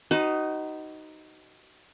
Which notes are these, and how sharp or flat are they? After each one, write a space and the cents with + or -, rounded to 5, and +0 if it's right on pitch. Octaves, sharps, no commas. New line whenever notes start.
D#4 +0 F#4 +35 B4 +35